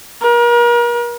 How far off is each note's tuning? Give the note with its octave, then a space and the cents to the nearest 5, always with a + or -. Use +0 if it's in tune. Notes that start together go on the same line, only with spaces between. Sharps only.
A#4 +40